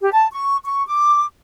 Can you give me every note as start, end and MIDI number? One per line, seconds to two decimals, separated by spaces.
0.01 0.12 67
0.13 0.27 81
0.32 0.57 85
0.65 0.84 85
0.87 1.22 86